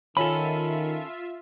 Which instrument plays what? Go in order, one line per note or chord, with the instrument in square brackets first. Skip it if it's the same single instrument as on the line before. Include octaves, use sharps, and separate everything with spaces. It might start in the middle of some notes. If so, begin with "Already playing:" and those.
[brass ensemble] D#3 [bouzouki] C#4 A4 [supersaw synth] F4 E5 [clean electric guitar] B5